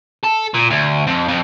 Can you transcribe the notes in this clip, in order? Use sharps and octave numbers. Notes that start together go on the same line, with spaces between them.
A4
A#2
D2
F2
F2